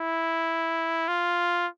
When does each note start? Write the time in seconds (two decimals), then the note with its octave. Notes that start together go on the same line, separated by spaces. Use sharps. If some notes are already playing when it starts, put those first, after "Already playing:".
Already playing: E4
1.08 F4